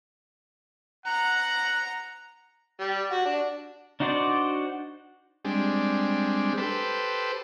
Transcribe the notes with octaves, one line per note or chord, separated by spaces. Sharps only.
F#5 A#5
G3
F#4
D4
D4 D#4 F#4 C5 D5
G3 G#3 C4 D4
G4 A4 B4 C5